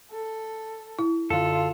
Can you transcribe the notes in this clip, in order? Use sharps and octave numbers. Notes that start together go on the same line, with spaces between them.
A4
E4
F#2 D3 F4 A4